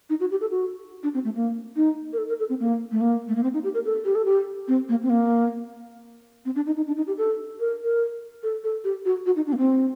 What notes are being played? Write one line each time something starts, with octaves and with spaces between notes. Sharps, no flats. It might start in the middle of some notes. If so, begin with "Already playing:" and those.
D#4
F#4
G4
A4
F#4
D4
C4
A3
A#3
D#4
A#4
A4
A#4
A4
C4
A#3
A3
A#3
A3
A#3
C4
D#4
G4
A#4
A4
G4
A4
G4
C4
A#3
C4
A#3
C4
D4
D#4
D#4
D4
D#4
G4
A4
A#4
A#4
A4
A4
G4
F#4
F#4
D#4
D4
A#3
C4